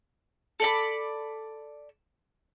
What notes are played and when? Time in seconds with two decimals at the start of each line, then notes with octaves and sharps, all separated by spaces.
0.60 A4 D5 B5